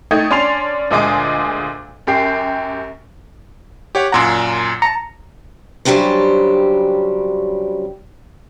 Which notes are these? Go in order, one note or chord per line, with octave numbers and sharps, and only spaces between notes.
A3 D#4 G5 G#6
C#4 D4 C6 C7 F7
D2 A#2 G#3 D#5 G#5 D6
F#2 G4 C7
G4 C#5 F#5
F#2 A#2 F#5 A#5 C6
A5 A#5 C#7
C#3 F#3 G3 D4 G4 C5